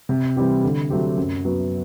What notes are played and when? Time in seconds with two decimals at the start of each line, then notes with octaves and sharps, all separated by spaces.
0.09 C3
0.37 E3 G3 C4 G4
0.64 D3
0.90 F#3 A3 C4 G4
1.17 F#2
1.45 F#3 B3